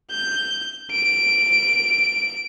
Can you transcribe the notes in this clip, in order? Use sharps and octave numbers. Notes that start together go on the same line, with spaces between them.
G6
D7